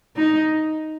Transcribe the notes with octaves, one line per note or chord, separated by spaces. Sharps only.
D#4